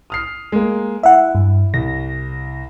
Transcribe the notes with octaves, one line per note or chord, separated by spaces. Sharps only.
D#6 F6 C7
G#3 A#3
E4 E5 F#5
G2
C2 A#6